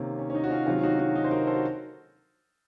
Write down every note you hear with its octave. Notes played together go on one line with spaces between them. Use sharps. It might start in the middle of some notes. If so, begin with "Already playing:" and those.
Already playing: C3 D#3 A#3 C#4
C#4
C#4
D#4
F#4
C#4 F4
C3 D#3 F#3 C#4 F4
D#4 F#4
D#4 F#4
D#4
C5
F#4 A#4
A4 C5
F#4